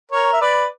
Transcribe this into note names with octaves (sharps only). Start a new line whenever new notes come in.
A#4 C#5
E5
B4 D5